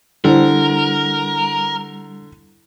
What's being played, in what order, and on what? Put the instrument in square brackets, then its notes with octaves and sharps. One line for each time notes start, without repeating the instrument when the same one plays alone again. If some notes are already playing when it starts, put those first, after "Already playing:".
[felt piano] D3 [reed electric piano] G3 [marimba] E4 C5 [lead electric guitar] A#4